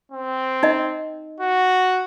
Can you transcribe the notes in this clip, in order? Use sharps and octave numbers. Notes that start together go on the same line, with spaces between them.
C4
D#4 D#5
F#4